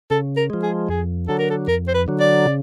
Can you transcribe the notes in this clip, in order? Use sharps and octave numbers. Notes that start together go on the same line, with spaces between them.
C#3 A4
A#4
F3 G#3
G#4
F2 G#4
D3 F#3 A4
A#4
A4
F2 A#4
C5
B4
D3 F#3
D5
C#3